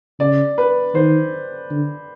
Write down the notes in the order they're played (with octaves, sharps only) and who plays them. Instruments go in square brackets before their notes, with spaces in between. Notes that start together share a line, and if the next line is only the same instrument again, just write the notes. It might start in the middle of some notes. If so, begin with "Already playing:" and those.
[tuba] C#3 [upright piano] D5
[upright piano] B4
[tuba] D#3 [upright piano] C5
[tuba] D3